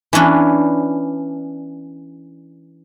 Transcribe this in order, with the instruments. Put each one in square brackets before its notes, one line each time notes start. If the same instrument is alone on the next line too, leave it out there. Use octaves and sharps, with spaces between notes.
[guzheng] E3 B3 C#4 D4